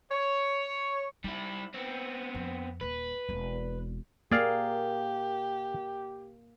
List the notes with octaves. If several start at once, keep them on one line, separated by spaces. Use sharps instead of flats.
C#5
G3 D#4 E4
B3 C4
F2
D#1 B4
E1 C4
A#3 G4 G#4 D5 F5